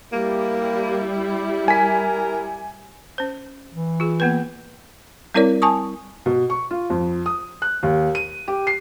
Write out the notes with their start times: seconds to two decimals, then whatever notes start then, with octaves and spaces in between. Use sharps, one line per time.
0.12 G3 A#3 E4
1.68 A#4 G#5 B6
3.18 C#4 C5
3.75 E3
4.00 F4 G#4
4.20 A#3 B3 B4
5.34 G3 C4 E4 A#4 C#5 D5
5.62 G#5 A5 C#6 D#6
6.26 B2
6.50 C#6
6.71 F4
6.90 F2
7.26 D#6
7.62 F#6
7.83 D#2
8.15 D#7
8.48 G4
8.67 C7